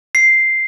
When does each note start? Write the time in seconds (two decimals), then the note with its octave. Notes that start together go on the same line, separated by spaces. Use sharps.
0.15 C7